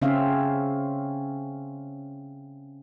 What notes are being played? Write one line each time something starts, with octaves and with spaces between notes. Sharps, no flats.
C#3 C4 C#4 E5 F5